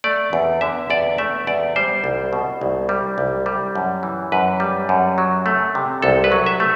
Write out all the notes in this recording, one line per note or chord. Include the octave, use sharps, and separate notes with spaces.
A3 D5
E2
D3 E5
E2 D5
A3 E5
E2 D5
G3 C5
C2
B2
C2
G3
C2
G3
F#2
E3
F#2 B4
G3
F#2
F#3
A3
C3
C2 A4
B4
F#3
E5
A3